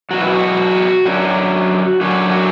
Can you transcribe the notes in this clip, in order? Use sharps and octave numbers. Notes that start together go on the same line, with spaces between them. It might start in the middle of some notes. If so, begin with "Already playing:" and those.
E2 B2 F#3 F#4
E4
F#4
F#2 D3 F#3
F#2 D3 F#3 F#4
F#4